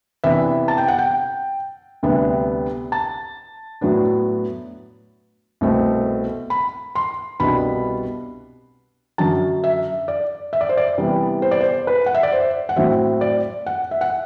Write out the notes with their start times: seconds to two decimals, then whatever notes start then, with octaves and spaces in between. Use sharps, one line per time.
0.24 C3 E3 B3 D4 E5
0.68 A5
0.78 G5
0.88 F#5
0.98 G5
2.03 D2 C3 G3 B3 D4
2.92 A5
3.81 A2 F#3 B3 D4
5.61 C2 B2 A3 C4
6.50 B5
6.95 C6
7.40 C2 B2 G3 D4 B5
9.18 F#2 D3 F#3 A5
9.64 E5
10.08 D5
10.53 E5
10.61 D5
10.69 C5
10.77 D5
10.98 C3 E3 G3 B3
11.42 C5
11.51 D5
11.61 C5
11.87 B4
12.06 F#5
12.14 E5
12.23 D5
12.32 C5
12.69 F#5
12.77 A2 F#3 C4 E5
13.21 D5
13.66 F#5
13.91 E5
14.01 F#5